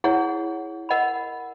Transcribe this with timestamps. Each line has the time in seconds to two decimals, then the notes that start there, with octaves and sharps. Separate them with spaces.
0.04 E4 G#4 C#5 F#5
0.89 A#4 D#5 F#5 B5